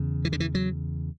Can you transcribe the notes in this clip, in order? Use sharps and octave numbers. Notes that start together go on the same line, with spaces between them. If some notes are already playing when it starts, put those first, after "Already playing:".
Already playing: E2 C#3
E3
D3
E3
F#3